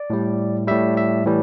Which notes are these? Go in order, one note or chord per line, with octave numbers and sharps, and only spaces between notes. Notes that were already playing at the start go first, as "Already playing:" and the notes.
Already playing: D5
A2 G3
A2 G3 E5
E5
A2 E3 G3